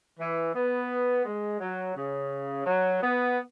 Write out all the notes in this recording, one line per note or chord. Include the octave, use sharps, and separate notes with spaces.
E3
B3
G#3
F#3
C#3
F#3
B3